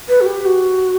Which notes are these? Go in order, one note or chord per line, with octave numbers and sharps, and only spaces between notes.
B4
F#4
G4
F#4